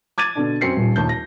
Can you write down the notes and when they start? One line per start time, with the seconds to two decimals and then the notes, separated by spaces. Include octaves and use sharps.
0.18 D6 G#6 A6 D#7
0.35 B2 D3 D4
0.61 F#2 F#3 C4 C7 C#7
0.76 D#1 A#1
0.96 A#1 D#2 A5 G6
1.09 A#6